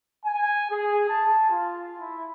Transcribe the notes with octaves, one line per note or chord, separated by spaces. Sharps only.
G#5
G#4
A5
F4
E4